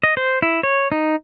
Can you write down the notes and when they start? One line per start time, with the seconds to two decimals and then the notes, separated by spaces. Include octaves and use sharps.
0.03 D#5
0.17 C5
0.42 E4
0.63 C#5
0.92 D#4